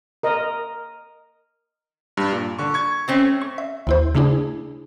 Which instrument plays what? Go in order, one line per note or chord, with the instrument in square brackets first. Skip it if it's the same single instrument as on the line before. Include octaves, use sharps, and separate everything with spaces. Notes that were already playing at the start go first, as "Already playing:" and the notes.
[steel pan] A#4 D#5
[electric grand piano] G2
A#2
D3 C#6
C#6 G#6
[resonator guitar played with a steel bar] A3 C4 C#4
[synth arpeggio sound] C#6
E5
D#2 E4 C5
C#3 A3 D4 E4 G#4